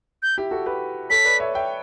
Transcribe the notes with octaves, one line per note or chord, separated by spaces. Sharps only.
G6
E4 G4
F#4 A4
G4 B4
A4 C#5 B6
B4 D5
C#5 E5
E5 G5